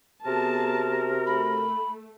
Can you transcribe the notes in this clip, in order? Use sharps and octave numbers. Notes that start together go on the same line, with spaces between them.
C3 B3 F#4 G#4 A#4 A5
A3 B5